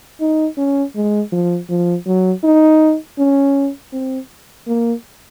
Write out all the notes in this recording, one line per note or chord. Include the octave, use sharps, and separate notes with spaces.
D#4
C#4
G#3
F3
F3
F#3
D#4
C#4
C4
A#3